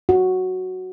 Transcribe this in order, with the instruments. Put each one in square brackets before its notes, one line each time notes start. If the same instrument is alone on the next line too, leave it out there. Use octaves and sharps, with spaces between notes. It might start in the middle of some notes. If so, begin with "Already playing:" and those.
[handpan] F#4